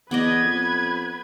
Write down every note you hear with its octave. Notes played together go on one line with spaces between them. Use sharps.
E2 B3 B4 D5 D#5 G#6
F2